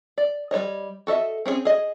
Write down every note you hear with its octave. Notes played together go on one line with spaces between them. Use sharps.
D5
G3 C5 C#5 D#5
F#4 A4 D#5 E5
C4 C#4 E4 G#4
G#4 D#5